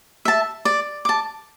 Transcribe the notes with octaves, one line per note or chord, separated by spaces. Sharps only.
E5 A5
D5
A5 D6